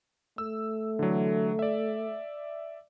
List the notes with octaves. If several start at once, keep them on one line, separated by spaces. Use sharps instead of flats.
A3 E6
D3 E3 F#3
D5 E5